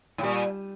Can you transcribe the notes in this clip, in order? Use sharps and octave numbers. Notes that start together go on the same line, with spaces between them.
A2
A#2 G3